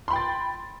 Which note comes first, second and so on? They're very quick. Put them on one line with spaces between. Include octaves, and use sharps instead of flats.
C6 B5 G5 A6